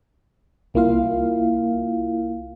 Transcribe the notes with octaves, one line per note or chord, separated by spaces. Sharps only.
C2 A#3 E4 F4 F5